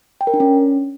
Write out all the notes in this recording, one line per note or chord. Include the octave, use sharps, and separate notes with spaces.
G5
A#4
D4
C#4